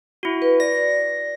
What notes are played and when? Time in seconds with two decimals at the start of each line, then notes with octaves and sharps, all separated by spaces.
0.23 E4 F#4
0.42 B4
0.60 D5 A#6